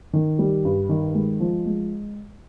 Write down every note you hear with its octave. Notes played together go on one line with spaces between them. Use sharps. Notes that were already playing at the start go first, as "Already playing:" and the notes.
D#3
G3
G2
D#3
G#3
F3
G#3